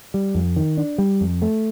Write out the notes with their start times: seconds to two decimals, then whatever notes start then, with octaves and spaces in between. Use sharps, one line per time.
0.14 G3
0.35 F2
0.56 D#3
0.77 D4
0.98 G3
1.21 F2
1.42 A3